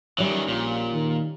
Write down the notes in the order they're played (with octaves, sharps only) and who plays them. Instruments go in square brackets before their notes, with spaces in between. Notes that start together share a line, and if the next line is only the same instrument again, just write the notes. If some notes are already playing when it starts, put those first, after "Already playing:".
[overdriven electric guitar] D#3 E3 [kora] G3 C#4
[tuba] A#1 [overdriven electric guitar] A#2
[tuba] D#3